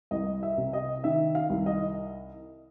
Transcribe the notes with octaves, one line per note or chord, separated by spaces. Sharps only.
C2 D#5
E5
C3
D#5
D#3 E5
F5
C2
D#5